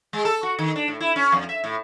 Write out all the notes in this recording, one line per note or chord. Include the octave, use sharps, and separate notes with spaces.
G#3
A4
F#4
D#3
D4
A2
E4
C#4
F2
E5
A2